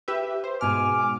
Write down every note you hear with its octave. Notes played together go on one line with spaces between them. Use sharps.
G4 B4 E5
C5
G#2 B2 G#5 D6 F6